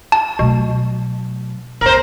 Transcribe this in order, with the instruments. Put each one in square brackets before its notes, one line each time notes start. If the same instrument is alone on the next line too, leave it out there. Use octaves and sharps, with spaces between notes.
[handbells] A5
[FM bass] B2 [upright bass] F#3 A3
[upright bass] A1 E2 [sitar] A#4 C5